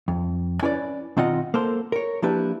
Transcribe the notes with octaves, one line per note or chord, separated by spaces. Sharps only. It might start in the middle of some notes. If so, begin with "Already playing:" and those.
F2
C#4 E4 B4 C#5 D5
B2 D#3 C4 F4 D#5 F#5
A#3 A4 C5
A#4 C#5
F3 A#3 D4 E4 G4 B4